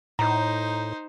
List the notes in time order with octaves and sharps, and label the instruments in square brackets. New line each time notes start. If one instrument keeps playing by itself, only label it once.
[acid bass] A2 [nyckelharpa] D#4 C5 [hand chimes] A#5